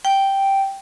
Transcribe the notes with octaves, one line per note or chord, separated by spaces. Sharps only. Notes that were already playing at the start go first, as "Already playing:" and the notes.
G5